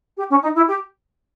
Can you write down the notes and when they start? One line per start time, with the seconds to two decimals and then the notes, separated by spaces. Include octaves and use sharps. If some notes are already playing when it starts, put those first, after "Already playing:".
0.18 G4
0.30 C#4
0.42 D#4
0.55 E4
0.68 G4